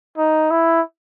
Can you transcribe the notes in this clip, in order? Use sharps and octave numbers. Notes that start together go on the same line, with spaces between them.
D#4
E4